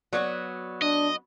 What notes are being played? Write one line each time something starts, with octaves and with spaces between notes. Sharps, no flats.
F#3 B3 F#4 D5
D4 D#5